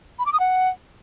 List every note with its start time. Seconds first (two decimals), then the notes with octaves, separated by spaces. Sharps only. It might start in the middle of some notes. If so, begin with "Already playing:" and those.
0.19 B5
0.26 D6
0.33 D#6
0.40 F#5